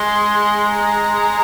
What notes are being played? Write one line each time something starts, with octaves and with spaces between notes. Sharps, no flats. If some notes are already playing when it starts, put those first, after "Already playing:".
Already playing: G#3 C6
A#5